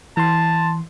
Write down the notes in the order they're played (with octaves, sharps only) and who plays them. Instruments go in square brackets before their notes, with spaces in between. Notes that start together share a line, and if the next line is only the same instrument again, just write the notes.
[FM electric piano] E3 C6 [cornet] A5